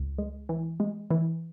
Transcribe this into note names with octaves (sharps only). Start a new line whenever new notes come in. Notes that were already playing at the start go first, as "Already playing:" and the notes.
Already playing: C#2
G#3
E3
G#3
E3